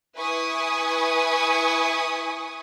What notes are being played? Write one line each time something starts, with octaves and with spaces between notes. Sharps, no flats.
E4 B4 G#5 C#6 D#6